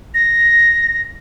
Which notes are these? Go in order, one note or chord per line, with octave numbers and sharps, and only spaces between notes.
A#6